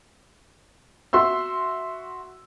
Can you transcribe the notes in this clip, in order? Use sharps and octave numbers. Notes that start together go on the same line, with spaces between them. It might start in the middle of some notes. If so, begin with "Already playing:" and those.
F#4 E5 C6 E6